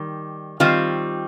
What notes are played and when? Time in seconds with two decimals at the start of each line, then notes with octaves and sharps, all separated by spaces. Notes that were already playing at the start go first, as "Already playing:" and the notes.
Already playing: D#3 G3
0.60 D#3 G3 C4 F4